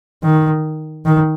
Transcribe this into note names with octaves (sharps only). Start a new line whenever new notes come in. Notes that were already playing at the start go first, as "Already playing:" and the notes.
D#3
D#3